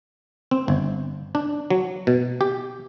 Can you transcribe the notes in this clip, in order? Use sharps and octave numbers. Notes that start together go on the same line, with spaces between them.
C4
G1
D4
F#3
B2
G4